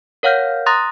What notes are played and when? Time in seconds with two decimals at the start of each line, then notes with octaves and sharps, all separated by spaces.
0.23 A#4 C#5 F5 F#5 F6 G6
0.66 A#5 C6 D#6 F#6 A6 A#6